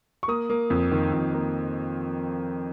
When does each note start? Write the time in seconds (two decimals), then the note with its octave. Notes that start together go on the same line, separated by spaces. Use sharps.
0.23 C#6
0.28 A#3 D#6
0.50 A#3
0.70 F2
0.92 D#3
1.13 F2
1.34 A#3